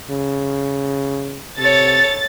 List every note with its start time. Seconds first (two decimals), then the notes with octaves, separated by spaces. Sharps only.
0.11 C#3
1.59 C3 A4 C#5 A6